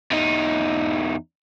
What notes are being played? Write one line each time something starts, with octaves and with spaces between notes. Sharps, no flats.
E2 D#4